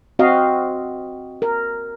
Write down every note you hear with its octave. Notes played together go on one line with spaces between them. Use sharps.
C4 F#4 D#5 F5
A#4